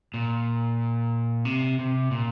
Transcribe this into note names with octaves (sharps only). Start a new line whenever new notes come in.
A#2
C3
C3
A#2